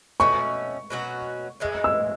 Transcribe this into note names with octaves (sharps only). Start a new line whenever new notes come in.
B2 A3 C#4 F#4 C#6
B2 F#3 C#4 F#4
A2 E3 G#3
E6